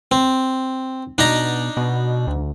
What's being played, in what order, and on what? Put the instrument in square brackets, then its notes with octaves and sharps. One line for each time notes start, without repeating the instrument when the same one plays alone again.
[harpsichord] C4
[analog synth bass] B2 [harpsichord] D4 D#4 A#5
[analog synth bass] B2
D2